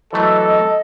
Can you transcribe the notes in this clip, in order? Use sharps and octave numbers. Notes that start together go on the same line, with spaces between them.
E3 F#3 A3 A4 D#5